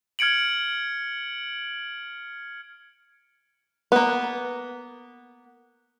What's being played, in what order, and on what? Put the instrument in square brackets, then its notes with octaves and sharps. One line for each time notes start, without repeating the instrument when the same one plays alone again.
[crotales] F6 G#6 C#7 D7 F#7
[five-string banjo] A#3 B3